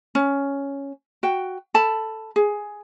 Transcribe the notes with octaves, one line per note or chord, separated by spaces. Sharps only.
C#4
F#4 G5
A4 A5 B5
G#4